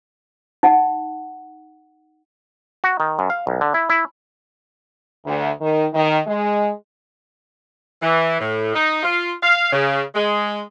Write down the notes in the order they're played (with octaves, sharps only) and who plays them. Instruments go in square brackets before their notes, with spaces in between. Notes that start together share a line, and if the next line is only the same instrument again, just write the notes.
[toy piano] D#4 F#5
[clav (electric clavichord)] F#4
D#3
F#2
F5
B1
D3
E4
E4
[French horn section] D2
D#3
D#3
G#3
[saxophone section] E3
A2
D#4
F4
F5
C#3
G#3